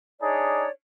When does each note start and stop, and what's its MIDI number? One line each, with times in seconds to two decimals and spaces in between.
0.21 0.66 62
0.21 0.66 63
0.21 0.66 68
0.21 0.70 73
0.21 0.70 74